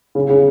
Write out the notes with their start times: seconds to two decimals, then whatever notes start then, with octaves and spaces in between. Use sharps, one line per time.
0.15 C#3
0.30 C#3